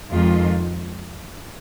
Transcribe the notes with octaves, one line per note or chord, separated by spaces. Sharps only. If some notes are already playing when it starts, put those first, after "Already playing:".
F2 D#3 G#3 F4